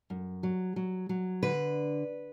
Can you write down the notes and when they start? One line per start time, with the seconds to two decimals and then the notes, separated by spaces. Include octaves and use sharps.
0.10 F#2
0.43 F#3
0.76 F#3
1.09 F#3
1.42 D3 B4